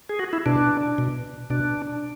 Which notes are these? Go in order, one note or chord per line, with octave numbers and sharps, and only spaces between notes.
G#4
F#4
E4
B2 D4
B2
B2 D4